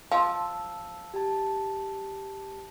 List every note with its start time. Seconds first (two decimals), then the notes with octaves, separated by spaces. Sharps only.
0.12 F3 F5 A5 E6
1.14 G4 A5